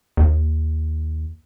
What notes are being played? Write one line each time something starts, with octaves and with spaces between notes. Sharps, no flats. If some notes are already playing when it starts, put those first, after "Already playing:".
D#2